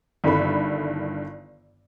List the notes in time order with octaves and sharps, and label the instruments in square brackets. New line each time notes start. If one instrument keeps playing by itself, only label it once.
[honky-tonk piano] G1 G2 D#3 E4 A4 B5